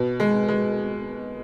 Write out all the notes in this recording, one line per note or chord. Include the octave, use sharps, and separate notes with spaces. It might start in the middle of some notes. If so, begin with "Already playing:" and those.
Already playing: B2
G#3
G#3